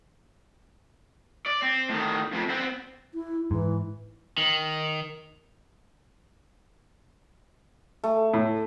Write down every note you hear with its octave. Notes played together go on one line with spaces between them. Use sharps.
D5
C4
A2 D#3
F2 C3
B3 C4
E4
G#2 E3
D#3
A3
A2